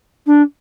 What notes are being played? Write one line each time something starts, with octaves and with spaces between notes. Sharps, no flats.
D4